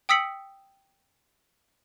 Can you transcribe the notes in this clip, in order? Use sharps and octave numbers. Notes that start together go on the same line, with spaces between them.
G5 D#6 E6 B6 C#7 F#7